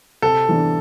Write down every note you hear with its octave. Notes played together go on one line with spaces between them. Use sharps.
C3 A4
E3 B3 D4